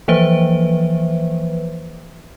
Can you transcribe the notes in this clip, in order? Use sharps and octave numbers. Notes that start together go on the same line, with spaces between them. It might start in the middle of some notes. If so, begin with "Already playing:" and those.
E3 F3 A#3 B4 C5 E5